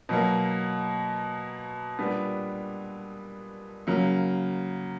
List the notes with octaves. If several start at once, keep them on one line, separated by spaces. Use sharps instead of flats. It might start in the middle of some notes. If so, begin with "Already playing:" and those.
B2 F#3 A#3
A#2 G3 B3 D4
C#3 F#3 A#3